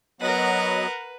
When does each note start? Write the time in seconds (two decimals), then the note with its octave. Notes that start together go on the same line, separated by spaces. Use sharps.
0.21 F#3 B3 A#4 B4 D#5 F#5